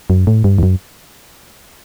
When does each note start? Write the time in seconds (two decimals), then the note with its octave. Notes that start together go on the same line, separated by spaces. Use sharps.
0.10 F#2
0.27 A2
0.44 G2
0.58 E2
0.63 F#2